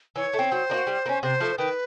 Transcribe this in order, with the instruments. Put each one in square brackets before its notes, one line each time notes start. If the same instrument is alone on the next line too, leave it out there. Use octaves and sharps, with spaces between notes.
[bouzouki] E3 [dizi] C#5
[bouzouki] A3
C4
[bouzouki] F#3 [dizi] C5
[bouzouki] A#3 D4
F#4
G3
A#3
C#4
[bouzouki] C3 [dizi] C5
[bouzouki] F3 A3
[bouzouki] D#3 [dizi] B4